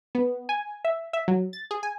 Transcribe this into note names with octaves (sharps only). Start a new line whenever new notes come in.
B3
G#5
E5
E5
F#3
A6
G#4
G#5